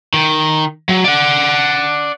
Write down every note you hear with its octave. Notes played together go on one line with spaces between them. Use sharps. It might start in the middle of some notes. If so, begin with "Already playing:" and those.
D#3
F#3
D5 F#5